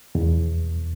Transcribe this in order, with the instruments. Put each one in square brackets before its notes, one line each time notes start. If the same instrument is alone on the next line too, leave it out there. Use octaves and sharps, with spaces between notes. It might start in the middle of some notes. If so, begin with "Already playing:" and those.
[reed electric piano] E2